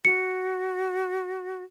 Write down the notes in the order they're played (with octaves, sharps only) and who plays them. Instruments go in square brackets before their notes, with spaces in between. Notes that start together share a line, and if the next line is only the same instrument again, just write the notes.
[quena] F#4 [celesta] C#7